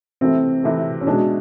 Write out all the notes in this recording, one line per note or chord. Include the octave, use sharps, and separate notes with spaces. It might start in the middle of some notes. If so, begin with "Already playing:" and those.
C3 E3 A3 C4
C3 E3 A3
C#4
B2 G#3 D4